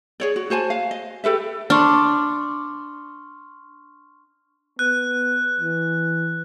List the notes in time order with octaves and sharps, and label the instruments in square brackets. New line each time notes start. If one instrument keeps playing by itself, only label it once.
[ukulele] G#4 C#5 D5
F#4
F#4 C5 G#5 A5
F5
D#5
G4 A4 B4 E5
[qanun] D4 [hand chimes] C6 C#6 F6
[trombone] B3 [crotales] F#6
[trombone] E3